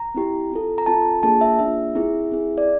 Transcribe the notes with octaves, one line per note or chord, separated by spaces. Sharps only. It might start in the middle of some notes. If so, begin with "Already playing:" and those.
Already playing: A#5
C4 E4 G4
C4 F4 A4
A#5
C4 F4 A4 A5
A#3 D4 F4 G#4 A5
E5
A#3 D4 F4 G#4 E5
C4 E4 G#4
C4 E4 G#4
D5